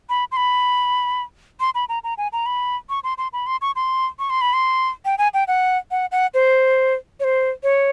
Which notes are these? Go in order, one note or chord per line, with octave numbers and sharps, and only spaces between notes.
B5
C6
B5
C6
B5
A#5
A#5
G#5
A#5
B5
C#6
C6
C6
B5
C6
C#6
C6
C#6
C6
B5
C6
G5
G#5
G5
F#5
F#5
F#5
C5
C#5
C5
C#5